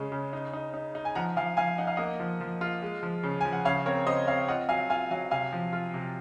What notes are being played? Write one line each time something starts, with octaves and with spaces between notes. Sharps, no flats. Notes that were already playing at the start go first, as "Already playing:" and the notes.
Already playing: C#3 G#3
C#3
D#4
D#4
D#4
D#4
G#5
F3 F#5 A#5
F3 F5 G#5
F3 F5 G#5
D#4 F#5
F5
A#3 D#5 F#5
F3
F3
F4
G#3
F3
C#3
F3 G#5
F#5
C#3 C#5 F5
C4 A#4 C#5
C#3 C5 D#5
C4 C#5 F5
F4 D#5 F#5
F#3 F5 G#5
F4 F5 G#5
F#3 F5 G#5
C3 F5 G#5
F3
F4
C3